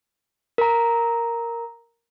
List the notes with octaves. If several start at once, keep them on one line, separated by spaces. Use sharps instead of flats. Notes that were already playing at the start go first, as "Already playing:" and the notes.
A#4 A#5